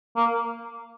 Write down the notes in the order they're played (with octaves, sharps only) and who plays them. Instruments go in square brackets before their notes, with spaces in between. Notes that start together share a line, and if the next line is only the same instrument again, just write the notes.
[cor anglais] A#3